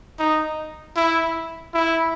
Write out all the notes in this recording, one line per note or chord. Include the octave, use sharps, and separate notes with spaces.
D#4
E4
E4